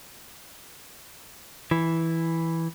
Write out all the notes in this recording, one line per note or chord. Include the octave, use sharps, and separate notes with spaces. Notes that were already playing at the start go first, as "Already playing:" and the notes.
E3